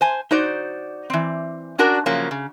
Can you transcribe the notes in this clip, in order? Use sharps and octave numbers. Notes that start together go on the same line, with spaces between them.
C5 G#5
D#4 F#4 C5 D5
E3 C4
C#4 D4 F#4 A#4 D5 A5
C#3 F3 F#3 A#3 C#4
C#3